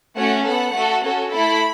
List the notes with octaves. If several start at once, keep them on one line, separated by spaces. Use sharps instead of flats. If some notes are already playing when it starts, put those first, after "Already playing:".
A3 C#4 F#4 F#5
B3 A4 F#5
A3 F#4 A4
C#4 F#4 A4
A3 E4 A4 B5